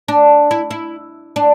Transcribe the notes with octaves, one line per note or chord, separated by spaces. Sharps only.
D4
E4
E4
D4